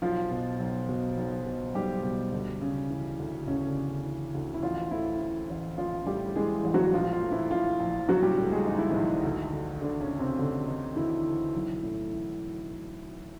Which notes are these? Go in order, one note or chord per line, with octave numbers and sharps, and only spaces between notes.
B1 F3 F4
B2
B1
B2
B1
B2
B1 G3 G4
B2
D2
C#3
E3
D2
D2 C#3 C#4
D3 D4
C#3
E3
D2
E4
A1 F3 F4
A2 E3 E4
E3
A1
A1 F3 F4
A2 G3 G4
E3 G#3 G#4
A1
F#3 F#4
A#1 F3 F4
F3 F4
A2
E3 E4
E3 F3 F4
A#1
A#1 F#3 F#4
G3 G4
A2
G#3 G#4
E3 D#4
E4
A#1 D#3 D#4
D2
D3
D2 D3 D4
C#3 C#4
D3
C3 C4
D2 D3 D4
D3 D#3 D#4
D2 E3 E4
D3
B1
A2
E3